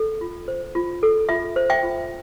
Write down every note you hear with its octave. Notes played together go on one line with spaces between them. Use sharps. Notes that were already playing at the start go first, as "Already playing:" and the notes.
Already playing: A4
F4
C5
F4
A4
F4 E5
C5
E5 G5
F4